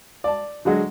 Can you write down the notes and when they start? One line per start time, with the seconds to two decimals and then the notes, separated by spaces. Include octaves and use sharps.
0.24 D5 A5
0.65 D3 F#3 G#3 F#4